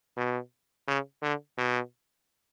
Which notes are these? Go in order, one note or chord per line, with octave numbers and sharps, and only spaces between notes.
B2
C#3
D3
B2